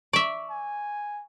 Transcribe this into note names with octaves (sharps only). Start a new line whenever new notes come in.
D5 E5 C#6
G#5